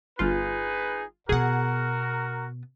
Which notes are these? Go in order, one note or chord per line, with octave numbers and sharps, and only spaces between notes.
G1 D#4 F4 G#4 B4
B2 B3 F#4 G#4 A#4 F#5